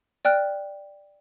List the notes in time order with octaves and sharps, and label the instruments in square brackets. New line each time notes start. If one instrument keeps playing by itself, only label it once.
[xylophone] D5 G5 F6 F#6